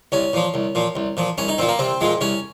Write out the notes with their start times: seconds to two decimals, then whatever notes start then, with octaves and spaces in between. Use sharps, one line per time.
0.12 C2 C#4
0.33 A#2 F3
0.54 C2
0.75 A#2 F3
0.96 C2
1.17 A#2 F3
1.38 C2 C#4
1.48 D#4
1.58 A#2 F3 C4
1.69 A#3
1.79 C2 C4
2.01 A#2 F3 G#3
2.21 C2 C#4